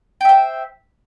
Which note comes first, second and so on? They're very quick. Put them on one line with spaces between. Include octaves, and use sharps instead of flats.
G5 E5 C5